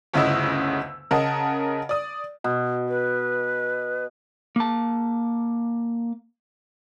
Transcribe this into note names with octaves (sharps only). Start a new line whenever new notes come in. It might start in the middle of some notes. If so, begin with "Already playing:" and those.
G1 D2 C#3 E4 D#5 E6
C#3 A#4 D#5 F#5 A5
D5 D#6
B2
B4
A#3 A5